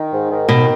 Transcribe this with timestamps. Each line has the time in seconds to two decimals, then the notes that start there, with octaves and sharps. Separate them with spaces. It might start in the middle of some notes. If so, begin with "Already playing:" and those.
Already playing: D#3
0.12 G#2
0.30 D#3
0.49 B2 D#3